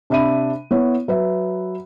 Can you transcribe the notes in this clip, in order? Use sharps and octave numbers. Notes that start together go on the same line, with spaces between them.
C3 D4 E5 B5 D#7
B3 E4 C#5
F#3 B4 E5